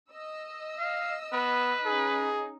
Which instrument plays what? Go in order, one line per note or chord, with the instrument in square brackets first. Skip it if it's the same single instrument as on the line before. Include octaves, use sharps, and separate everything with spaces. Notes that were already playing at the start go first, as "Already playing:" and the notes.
[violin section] D#5 E6
[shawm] F5
[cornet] B3 [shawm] B4
[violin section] C#4 D#4 [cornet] G#4